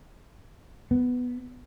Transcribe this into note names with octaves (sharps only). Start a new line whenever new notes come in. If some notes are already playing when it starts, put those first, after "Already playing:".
B3